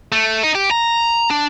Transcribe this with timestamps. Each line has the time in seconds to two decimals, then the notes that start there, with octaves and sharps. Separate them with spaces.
0.12 A3
0.43 D#4
0.55 G4
0.71 A#5
1.31 D4